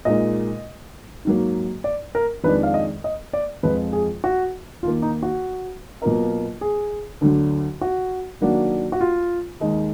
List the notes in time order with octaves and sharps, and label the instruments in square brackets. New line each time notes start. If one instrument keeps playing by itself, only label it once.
[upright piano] A#2 G#3 D#4 A#4 [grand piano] D#5
[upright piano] G#2 F#3 A#3
[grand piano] D5
A#4
[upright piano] F2 D#3 G#3 D4 [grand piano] B4
[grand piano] F5
D#5
D#5
D5
[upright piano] F2 F3 G#3 [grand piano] B4
[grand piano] G#4
F#4
[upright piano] D#2 D#3 A#3 [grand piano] F4
[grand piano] D#4
F#4
[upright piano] B2 F#3 A#3 F4 A#4
[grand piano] G#4
[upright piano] D2 D3 F#3
[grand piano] F#4
[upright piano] D#3 F#3 A#3 D4 F#4
[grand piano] F#4
F4
[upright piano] D#2 D#3 G#3 D#4